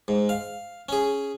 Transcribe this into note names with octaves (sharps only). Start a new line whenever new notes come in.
G#2
F5
C#4 G#4